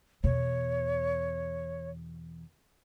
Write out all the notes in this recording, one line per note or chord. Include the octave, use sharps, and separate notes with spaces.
E2 B2 C#5